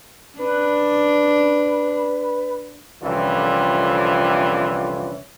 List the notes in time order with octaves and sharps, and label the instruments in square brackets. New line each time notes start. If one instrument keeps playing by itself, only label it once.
[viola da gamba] D4 [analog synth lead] B4
[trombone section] C2 F2 D3 E3 C#4 F4